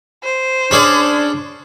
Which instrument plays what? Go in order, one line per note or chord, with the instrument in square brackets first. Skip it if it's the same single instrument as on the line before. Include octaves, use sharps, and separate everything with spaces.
[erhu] C5
[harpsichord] C#4 G#4 D5 [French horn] D4